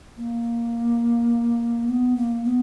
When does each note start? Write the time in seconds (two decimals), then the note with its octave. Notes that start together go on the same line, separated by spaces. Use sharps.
0.17 A#3
1.87 B3
2.16 A#3
2.44 B3